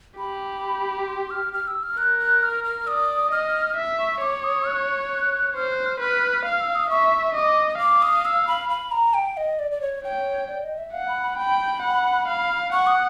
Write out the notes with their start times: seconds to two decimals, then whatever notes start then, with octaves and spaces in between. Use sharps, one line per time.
0.19 G4 B5
1.08 C6
1.30 F6
1.53 F6
1.68 E6
1.83 F6
1.98 A#4 F#6
2.20 F#6
2.43 F6
2.64 F6
2.87 D5 D#6
3.31 D#5 F6
3.76 E5
3.99 C#6
4.21 C#5 D6
4.44 D#6
4.67 F#6
5.56 C5 F6
5.71 F#6
5.86 F6
6.00 B4 F6
6.45 F5 F6
6.60 E6
6.75 D#6
6.90 E5 C#6
7.35 D#5 D6
7.79 F5 D6
8.02 D#6
8.25 E6
8.47 B5
8.69 B5
8.92 A#5
9.14 G5
9.37 D#5
9.59 D5
9.71 D5
9.81 C#5
10.04 C#5 G5
10.48 D5
10.63 D#5
10.78 E5
10.93 F5 F#5
11.08 B5
11.23 B5
11.38 G5 B5
11.82 F#5
12.28 F5
12.73 F#5 C#6
12.87 D#6